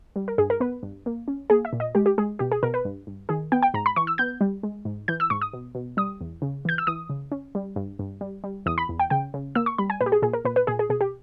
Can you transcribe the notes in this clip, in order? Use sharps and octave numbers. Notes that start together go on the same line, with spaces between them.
G3
A#4
G2 G#4
A#4
B3 B4
G2
A#3
C#4
A#3 G#4
E5
A#2
D#5
G#3 G4
G4
G#3 G#4
B2 G4
G#4
B2 A#4
B4
G2
G2
D#3 G#4
B3 G5
G5
G#2 A#5
B5
E3 C#6
E6
B3 G6
G3
G#3
G#2
E3 G6
E6
G#2 C#6
D#6
B2
B2
G3 D#6
E2
C#3
E3 G6
E6
E3 D#6
C#3
C#4
G3
G2
G2
G3
G3
E2 D#6
B5
E2
G5
C#3 G5
C#3
A#3 E6
C#6
G3 B5
G#5
A#2 B4
G4
G#4
A#2 G#4
A#4
A#2 B4
B4
A#2 G#4
G#4
B2 G#4
G4